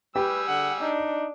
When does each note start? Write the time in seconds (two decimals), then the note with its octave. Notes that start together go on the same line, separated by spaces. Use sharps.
0.16 G3 G4 G#4 B4 E6
0.49 D3 F#5
0.82 D4 D#4